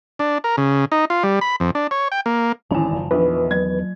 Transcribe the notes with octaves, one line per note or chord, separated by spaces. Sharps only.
D4
A#4
C#3
D#4
F4
G3
B5
F2
D4
C#5
G5
A#3
D1 G#1 E2 C#4 G#5 A5
F#1 F3
A#1 E2 D#3 F4 B4
F#3 G#6